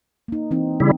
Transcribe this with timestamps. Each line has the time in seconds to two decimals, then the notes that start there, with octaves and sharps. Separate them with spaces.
0.28 A#3 D#4
0.51 E3 C4 D#4
0.80 C#3 G3 E4